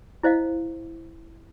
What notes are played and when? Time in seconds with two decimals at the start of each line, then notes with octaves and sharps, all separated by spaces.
0.23 E4 C5 D#5 F5